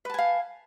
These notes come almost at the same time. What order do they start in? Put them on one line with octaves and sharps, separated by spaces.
B4 A5 G#5 F5